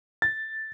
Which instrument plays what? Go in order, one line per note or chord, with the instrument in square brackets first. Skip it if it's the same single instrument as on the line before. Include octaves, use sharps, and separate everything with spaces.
[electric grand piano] A6